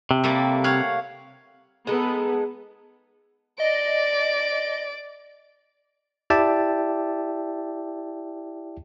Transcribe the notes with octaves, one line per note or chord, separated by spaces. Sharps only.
C3
G3 A3 A#3
C#5 F5 F#5
G#3 B3 D#4 A4
D5 D#5 D7
E4 G4 D5 E5 G5 A5